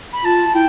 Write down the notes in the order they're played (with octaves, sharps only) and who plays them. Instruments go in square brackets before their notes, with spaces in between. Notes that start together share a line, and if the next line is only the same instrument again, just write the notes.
[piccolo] B5
[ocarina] F4 [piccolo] A5
[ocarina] E4 [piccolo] G5